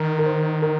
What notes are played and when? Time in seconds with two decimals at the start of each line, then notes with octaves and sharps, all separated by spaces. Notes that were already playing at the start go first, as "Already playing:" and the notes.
Already playing: D#3 A#4
0.19 A#4
0.26 C5
0.62 A#4